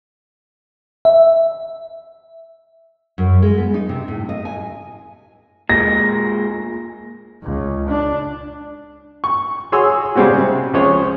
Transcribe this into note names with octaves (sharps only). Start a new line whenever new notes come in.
E5
F#2
G#3
B3
D#4
C3
A2
D#5
G#5
A#2 G#3 A#6
C#2
D4
C#6
F#4 G#4 C#5 C6 E6
C#3 G3 G#3 C4 C#4 F#4
C3
C#2 F3 G#4 C5 C#5